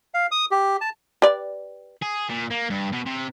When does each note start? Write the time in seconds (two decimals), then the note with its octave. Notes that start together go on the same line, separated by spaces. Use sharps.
0.14 F5
0.31 D#6
0.51 G4
0.81 A5
1.22 G4 B4 D5
2.03 G#4
2.30 A#2
2.51 A#3
2.70 G2
2.92 B2
3.06 C3